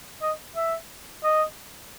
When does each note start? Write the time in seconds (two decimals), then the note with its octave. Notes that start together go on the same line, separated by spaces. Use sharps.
0.22 D#5
0.56 E5
1.24 D#5